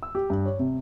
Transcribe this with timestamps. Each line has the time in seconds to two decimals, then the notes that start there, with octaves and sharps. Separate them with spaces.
0.03 E6
0.15 G4
0.30 G2
0.45 C#5
0.59 C3